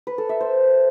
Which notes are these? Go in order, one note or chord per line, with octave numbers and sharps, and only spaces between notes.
B4
A4
E5
C5